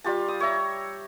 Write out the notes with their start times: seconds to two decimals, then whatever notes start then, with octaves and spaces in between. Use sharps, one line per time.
0.04 G3 F4 G4 A5
0.28 D#6
0.40 C#5 E5 A#5